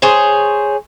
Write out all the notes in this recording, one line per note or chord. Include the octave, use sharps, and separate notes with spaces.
G#4 C5 C#5